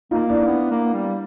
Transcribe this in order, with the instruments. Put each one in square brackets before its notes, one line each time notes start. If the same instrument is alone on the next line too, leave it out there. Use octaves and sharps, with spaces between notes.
[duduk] A#3 [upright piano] D#4 F4
[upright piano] D4 E4
[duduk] B3
A#3
G3